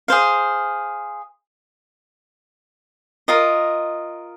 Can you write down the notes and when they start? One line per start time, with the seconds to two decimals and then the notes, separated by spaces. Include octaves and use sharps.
0.08 G#4 C5 F5
3.28 F4 A#4 D#5